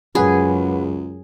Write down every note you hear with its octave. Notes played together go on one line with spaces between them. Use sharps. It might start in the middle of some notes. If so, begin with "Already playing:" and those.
C#2 F#2 G#4 B4 F#5 B5